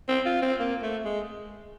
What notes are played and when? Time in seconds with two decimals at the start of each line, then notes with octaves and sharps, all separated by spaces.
0.09 C4
0.25 F4
0.42 C4
0.60 A#3
0.82 A3
1.05 G#3